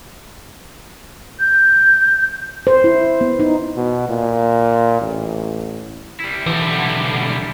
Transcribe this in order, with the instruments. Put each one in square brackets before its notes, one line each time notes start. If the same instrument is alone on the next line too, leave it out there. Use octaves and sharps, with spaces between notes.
[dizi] G6
[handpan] C5
E4
B3
D#4
[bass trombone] B2
A#2
A1
[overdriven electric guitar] G3 E4
[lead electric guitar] B1 D3 [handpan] E3